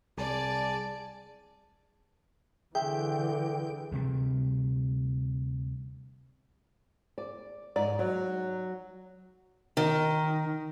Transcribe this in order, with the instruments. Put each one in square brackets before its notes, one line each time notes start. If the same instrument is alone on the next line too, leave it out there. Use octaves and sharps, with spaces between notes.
[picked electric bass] C2 [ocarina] G#4 [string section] D5 [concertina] G#5 A5
[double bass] D3 E3 [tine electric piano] G#4 E5 [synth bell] G5
[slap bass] D2 C3 G3
[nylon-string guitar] D5
[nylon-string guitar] G#2 [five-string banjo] D#4 D5
[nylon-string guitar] F#3
[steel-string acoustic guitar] D#3